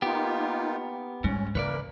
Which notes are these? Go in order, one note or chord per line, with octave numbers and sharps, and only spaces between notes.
A#3 B3 D#4 F4 G4
G#2 G3 C#4
C#3 E3 A#3 A#4 B4 C#5 D5